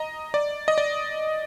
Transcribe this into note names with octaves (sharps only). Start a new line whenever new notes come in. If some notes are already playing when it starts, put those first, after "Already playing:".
Already playing: D#5 A#5
D5
D#5
D5